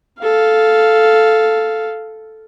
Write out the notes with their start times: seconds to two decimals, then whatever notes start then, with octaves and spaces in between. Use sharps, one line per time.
0.21 A4 F5